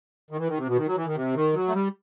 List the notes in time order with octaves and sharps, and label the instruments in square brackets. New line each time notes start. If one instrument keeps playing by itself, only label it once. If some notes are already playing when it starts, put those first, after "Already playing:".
[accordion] D#3
E3
D#3
C3
B2
D#3
F#3
E3
D#3
C3
D#3
F#3
A3
G3